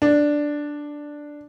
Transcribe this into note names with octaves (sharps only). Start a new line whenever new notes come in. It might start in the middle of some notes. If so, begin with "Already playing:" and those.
D4